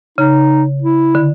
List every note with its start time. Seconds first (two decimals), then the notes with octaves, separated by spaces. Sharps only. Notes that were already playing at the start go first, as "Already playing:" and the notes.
0.18 C#3 D#4
0.82 E4
1.15 D3